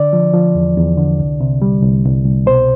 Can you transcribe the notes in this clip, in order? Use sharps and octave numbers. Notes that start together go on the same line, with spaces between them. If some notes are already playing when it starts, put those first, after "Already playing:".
Already playing: D3 D5
F3
F3
E2
E2
D3
C2
C3
G3
C2
C2
C2
B2 C5